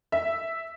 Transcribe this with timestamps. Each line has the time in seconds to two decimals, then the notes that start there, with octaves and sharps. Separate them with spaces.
0.12 E5